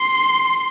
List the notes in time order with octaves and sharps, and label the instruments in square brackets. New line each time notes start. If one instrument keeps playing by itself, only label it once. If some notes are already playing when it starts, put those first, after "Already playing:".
Already playing: [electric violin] C6